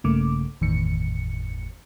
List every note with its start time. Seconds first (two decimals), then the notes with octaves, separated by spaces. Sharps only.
0.04 A#1 G2 C#3 A3 A#3 D6
0.61 G1 E2 A2 D#3 C#7